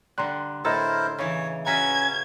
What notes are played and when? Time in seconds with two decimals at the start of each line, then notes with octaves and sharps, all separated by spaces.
0.18 D3 G3 A#5 C6 F#6
0.65 A2 E4 A4 A#4 C5 D#5 A#5 E6
1.19 C#3 E3 C#5
1.66 C#4 F#4 B4 E5 A#5 G#6